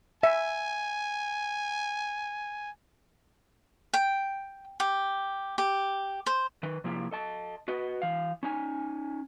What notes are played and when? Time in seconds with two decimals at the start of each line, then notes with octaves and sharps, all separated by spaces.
0.23 E5 G#5
3.93 G5
4.80 G4
5.58 G4
6.26 C5
6.63 D#3 B4
6.84 C3 F3 A#3 E4 G4
7.11 A4 D#5 A5
7.68 F#4 B4 D#5
8.02 E3 F5
8.43 C#4 D#4 G#5